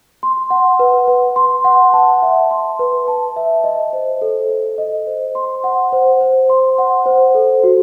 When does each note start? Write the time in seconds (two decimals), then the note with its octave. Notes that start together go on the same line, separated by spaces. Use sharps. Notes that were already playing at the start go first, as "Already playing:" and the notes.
0.23 C6
0.50 F#5
0.79 B4
1.08 B4
1.36 C6
1.64 F#5
1.93 A5
2.22 E5
2.51 C6
2.79 B4
3.08 A5
3.36 E5
3.64 D#5
3.93 C5
4.22 A4
4.50 A4
4.78 D#5
5.07 C5
5.35 C6
5.64 F#5
5.92 C5
6.21 C5
6.50 C6
6.78 F#5
7.06 C5
7.35 A4
7.64 F#4